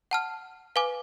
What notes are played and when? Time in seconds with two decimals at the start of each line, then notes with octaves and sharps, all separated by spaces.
0.11 F#5 A5 F6
0.76 B4 F5 G#5 D6